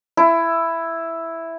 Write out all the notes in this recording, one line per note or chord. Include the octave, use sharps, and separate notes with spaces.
E4